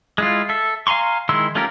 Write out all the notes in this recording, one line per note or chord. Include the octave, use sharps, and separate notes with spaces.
G#3 E4 F4
A4 E5
F5 G#5 A#5 C6 C#6
D#3 G#3 E4 C6 E6
A3 C#4 F4 G4 A#4